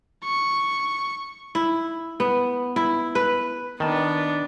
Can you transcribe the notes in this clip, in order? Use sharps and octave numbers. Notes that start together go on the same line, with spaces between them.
C#6
E4
B3
E4
B4
D#3 B3 D4 A5